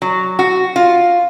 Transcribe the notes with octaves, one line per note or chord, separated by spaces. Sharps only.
F#3
F#4
F4